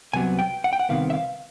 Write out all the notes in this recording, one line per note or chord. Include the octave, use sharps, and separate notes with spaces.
C2 C3 F#3 B3 G#5
G5
F#5
G5
F#5
C2 C3 D#3 B3 F5
E5
F5